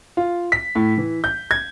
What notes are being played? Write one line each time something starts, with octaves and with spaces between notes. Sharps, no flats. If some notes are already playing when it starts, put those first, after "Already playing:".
F4
B6
A2
E3
G6
G#6